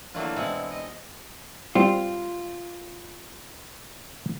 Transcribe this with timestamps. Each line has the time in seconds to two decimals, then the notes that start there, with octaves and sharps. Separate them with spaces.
0.14 E3 F#3 A3 A#3 D4 F4
0.36 B2 G#3 C4 E4 F#5
0.71 D#5
1.75 G3 C4 F4